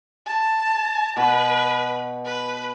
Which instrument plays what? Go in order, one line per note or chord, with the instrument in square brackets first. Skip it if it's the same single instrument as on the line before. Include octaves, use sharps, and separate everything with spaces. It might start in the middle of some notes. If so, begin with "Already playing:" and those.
[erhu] A5
[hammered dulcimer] B2 [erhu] B4
[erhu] B4